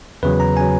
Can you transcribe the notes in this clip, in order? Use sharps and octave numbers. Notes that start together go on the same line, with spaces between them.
E2 C#3 F#3 B4
A#5
C#3 F#3 G#5